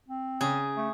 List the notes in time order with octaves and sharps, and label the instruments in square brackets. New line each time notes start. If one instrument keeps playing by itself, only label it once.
[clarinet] C4
[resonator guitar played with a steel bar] C#3 [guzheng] G#4
[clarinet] A3